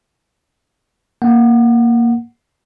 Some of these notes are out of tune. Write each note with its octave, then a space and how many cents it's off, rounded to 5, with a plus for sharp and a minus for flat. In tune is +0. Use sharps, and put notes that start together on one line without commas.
A#3 +0 F#5 +0